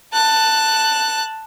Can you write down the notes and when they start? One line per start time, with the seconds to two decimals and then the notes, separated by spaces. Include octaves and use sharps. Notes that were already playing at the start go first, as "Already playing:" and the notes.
0.13 A5 F#6